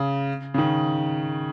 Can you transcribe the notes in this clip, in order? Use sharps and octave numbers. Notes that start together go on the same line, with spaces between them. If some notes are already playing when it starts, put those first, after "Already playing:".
Already playing: C#3
C#3
D#3